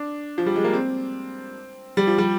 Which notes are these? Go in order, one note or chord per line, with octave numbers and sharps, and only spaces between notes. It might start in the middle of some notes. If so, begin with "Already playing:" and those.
Already playing: D4
F3
G3
G#3
A#3
C4
G3
F3
G3